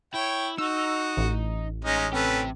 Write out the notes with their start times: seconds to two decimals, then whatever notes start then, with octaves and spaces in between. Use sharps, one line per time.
0.14 E4 C#5 G5
0.58 D#4 F#4 E6
1.17 A1
1.85 G#3 C#4 D#4
2.13 C3 C#4 G4 A4 B4